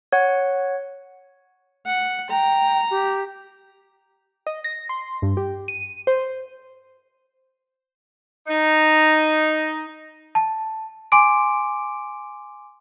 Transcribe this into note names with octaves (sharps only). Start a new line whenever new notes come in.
C#5 F#5
F#5
G5 A#5
G4
D#5
A#6
C6
G2
G4
D#7
C5
D#4
A5
G#5 C6 D6 D7